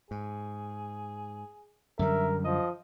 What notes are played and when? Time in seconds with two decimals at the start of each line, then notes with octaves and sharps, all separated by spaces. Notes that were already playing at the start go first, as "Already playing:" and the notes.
0.11 G#2 G#4
1.99 F#2 D3 G3 A#4 E5
2.45 F3 D#5